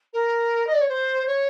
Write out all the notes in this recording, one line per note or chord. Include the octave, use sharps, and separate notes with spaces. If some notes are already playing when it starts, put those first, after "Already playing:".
A#4
D#5
D5
C#5
C5
C#5